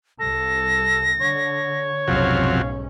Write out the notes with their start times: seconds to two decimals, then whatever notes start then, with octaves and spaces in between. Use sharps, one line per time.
0.20 C2 A4 A#6
1.21 D3 C#5
2.08 B1 F2 G#2 C3 F#3 C#4 F5